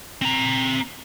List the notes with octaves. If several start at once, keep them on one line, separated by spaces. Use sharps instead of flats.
C4 A#5